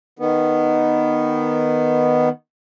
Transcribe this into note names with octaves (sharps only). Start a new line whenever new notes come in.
D#3 B3